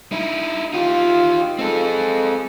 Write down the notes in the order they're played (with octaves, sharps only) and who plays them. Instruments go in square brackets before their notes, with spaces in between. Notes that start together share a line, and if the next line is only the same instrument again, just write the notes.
[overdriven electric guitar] D#4 E4
[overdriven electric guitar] D#4 G4 [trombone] F4
[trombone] G#3 [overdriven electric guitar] C4 A4